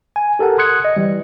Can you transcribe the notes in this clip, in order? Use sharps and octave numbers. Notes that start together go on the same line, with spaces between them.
G#5
G4 A4 A#4 F#5
C6 D#6 F#6 G#6 C#7
D#5
E3 G3